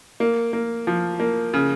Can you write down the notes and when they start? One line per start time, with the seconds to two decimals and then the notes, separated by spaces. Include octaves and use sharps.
0.20 A#3
0.53 A#3
0.87 F3
1.20 A#3
1.54 C#3